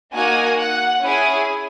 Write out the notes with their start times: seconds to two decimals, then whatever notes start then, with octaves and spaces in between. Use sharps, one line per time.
0.13 A#3 D#4 F#4 G#5
0.57 F#5
1.02 C#4 E4 G#4 G#5